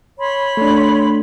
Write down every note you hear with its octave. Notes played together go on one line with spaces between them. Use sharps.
C#5 B5 C6
A3 D4